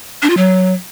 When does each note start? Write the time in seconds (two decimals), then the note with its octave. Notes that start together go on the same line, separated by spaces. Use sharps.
0.23 D4
0.30 F4
0.37 F#3